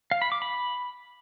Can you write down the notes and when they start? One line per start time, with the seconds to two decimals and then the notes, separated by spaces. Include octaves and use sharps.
0.11 F5
0.22 B5
0.32 D6
0.42 B5